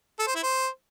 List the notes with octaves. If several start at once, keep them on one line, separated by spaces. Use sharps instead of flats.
A4
C5
E4
C5